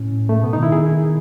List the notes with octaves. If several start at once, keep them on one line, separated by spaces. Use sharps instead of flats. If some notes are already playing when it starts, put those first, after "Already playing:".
Already playing: A2 C#4
A3
B2 B3
D#4
D#3
E4
G#4